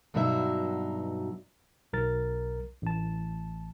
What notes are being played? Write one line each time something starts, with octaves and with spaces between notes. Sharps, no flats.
G2 B2 F#3 D#4 F4 E5
B1 A#4 A6
A1 A5